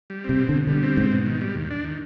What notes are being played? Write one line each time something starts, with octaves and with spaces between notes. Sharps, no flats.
G3
C3 C4
B2
B2 D3
D3 G3
C4
G#2 B2
B2
D#3
G3
D#2
D4
D#3